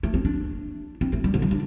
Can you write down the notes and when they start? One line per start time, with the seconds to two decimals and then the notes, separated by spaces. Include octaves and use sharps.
0.03 A3
0.14 C4
0.25 D4
1.01 C4
1.13 A3
1.24 G3
1.34 D3
1.42 G3
1.51 D4